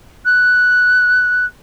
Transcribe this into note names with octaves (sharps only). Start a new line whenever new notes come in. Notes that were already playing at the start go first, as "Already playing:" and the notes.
F#6